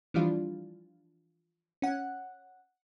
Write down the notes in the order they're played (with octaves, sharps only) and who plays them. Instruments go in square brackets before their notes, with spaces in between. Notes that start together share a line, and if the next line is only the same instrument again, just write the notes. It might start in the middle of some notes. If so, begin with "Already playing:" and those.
[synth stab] E3 F3 G3 D4 F4
C#4 F#5